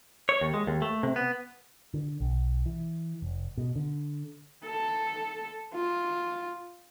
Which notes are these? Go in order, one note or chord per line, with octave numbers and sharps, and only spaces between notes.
C#5
D#2
G#3
D#2
A3
C3
B3
D3
B1
E3
F1
B2
D3
A4
F4